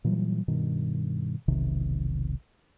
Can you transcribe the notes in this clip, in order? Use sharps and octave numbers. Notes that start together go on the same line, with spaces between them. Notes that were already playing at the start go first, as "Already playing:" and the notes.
A#2 E3 F#3 G3
G2 B2 D#3
E1 B1 C3 D#3